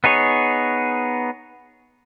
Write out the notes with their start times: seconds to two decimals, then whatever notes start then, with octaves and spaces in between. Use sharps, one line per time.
0.04 B3 D#4 G#4 C#5